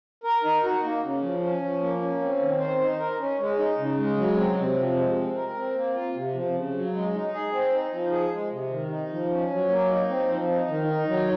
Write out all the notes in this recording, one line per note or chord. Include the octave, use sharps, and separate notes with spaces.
A#4
D#4
F#4
A#3
C#3
F3
C#4
F3
A#3
C#4
C4
D#3
C5
D#4
A#4
C#4
G#3
D#4
C#3
G#3
F#3
C4
C3
F3
G#3
C4
A#4
C4
A#3
F4
C3
F3
C#3
F#3
G#3
D#4
G#4
C4
D#4
F3
G#4
G#3
C3
D#3
D#4
F3
C#4
F#3
A#3
D#4
C4
F3
D#4
D#3
D#4
F#3